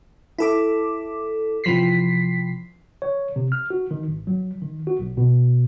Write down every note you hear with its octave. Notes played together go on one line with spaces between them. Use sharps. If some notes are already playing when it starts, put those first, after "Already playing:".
E4 A4 D6
C3 E3 F3 B6 C7
C#5
C3
F6
F#4
D#3
G#1
F#3
D#3
F#4
B1
B2